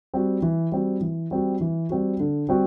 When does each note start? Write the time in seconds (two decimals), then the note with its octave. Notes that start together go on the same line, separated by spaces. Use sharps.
0.14 G3 C4 F#4
0.42 E3
0.72 G3 C4 F#4
1.01 E3
1.31 G3 C4 F#4
1.61 E3
1.89 G3 C4 F#4
2.20 D3
2.49 G3 C4 F#4